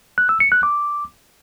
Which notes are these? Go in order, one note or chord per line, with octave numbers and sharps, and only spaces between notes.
F#6
E6
C#7
F#6
D6